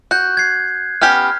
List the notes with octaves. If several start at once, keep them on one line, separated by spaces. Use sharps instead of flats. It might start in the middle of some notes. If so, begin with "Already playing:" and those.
F#4 F#6 G6
G#6 C7
B3 C#4 G4 F6